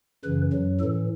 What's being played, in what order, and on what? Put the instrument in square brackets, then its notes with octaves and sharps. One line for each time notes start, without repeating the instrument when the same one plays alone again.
[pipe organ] F#2 C#3 E3 B4
F#2 F#3
A2 E3 A4